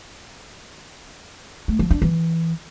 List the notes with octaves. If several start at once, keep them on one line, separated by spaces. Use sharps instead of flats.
A3
F3
D4
E3